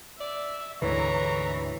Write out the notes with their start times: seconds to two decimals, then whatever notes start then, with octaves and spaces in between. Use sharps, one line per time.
0.21 D5 E5
0.82 D2 G#2 D3 E3 B4 C#5 A#5 C#6